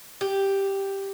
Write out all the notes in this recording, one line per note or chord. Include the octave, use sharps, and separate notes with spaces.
G4